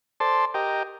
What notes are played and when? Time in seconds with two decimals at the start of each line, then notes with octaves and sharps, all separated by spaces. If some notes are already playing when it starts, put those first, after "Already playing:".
0.20 A4 C5 D5 A5 C6
0.54 G4 A#4 D#5 G5